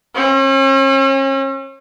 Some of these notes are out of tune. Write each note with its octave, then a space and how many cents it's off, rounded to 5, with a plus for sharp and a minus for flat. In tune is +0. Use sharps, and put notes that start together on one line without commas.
C#4 -40